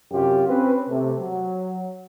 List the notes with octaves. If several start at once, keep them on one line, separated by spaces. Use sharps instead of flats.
F#2 C3 F4 G4
C4 C#4 B4
C3 A3
F#3